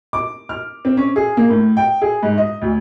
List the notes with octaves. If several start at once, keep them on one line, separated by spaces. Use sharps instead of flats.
D6
F6
C4
C#4
G#4
A#3
A2
G5
G#4
G#2
D#5
D2